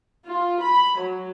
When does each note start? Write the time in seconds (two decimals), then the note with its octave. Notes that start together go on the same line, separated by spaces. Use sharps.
0.24 F4
0.61 B5
0.97 F#3